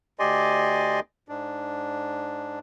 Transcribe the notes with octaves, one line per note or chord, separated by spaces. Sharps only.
D2 G4 D5 D#5 G#5 C6
G#2 D4